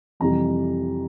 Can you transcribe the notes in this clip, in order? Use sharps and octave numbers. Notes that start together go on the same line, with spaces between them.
F2 C3 E3 G3 A#5